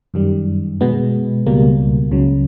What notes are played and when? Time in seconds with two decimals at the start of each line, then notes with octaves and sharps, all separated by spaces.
0.14 F#2 D#3 G3
0.81 B2 G#3 B3
1.46 C#2 B2 G3 A#3
2.11 C#2 C#3 F#3